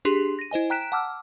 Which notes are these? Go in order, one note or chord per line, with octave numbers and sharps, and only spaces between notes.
D4 G4 G#4 C6
A#6 D#7
E4 C5 D#5 G#5
G5 A#5 F#6 B6 D7 E7
F#5 A5 D6 E6 F6